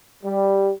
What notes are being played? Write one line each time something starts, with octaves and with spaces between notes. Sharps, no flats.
G3